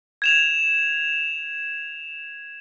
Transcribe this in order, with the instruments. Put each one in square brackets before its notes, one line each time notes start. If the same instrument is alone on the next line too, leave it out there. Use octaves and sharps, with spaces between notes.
[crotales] G#6 E7 F7